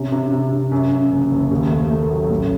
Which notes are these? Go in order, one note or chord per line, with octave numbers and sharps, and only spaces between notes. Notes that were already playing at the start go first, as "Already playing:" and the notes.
Already playing: C3 C#4
C3
C3
C3
F#2
F#2
F#1
F#1
D#2
A3
A3
F#3
A1